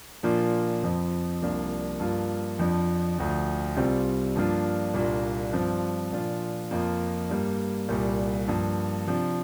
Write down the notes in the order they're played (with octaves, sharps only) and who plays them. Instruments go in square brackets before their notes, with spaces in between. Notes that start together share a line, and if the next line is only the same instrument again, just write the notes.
[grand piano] A#2 F3 A#3 D4 F4
F2 F3 C4
C2 C3 F3 A#3 D4
G2 F3 A#3 F4
F2 F3 D4
D2 D3 F3
C2 C3 G3 C4 F4
G2 F3 A#3 D4 F4
C2 A#2 A#3 D4 F4
G2 F3 C4 F4
A#2 F3 D4 F4
F2 F3 A#3 F4
G2 G3 A#3
C2 A#2 G3
G2 F3 A#3
C3 F3 D4